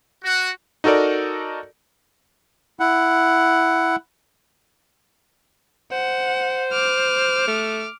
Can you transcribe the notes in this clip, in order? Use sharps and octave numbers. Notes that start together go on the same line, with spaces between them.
F#4
D#4 F#4 A4 A#4 D5
E4 F#5
C5 F#5
D6 F6
A3